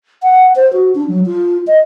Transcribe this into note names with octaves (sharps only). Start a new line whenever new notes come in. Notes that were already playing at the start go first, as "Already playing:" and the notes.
F#5
C5
F#4
D4
F#3
F4
D#5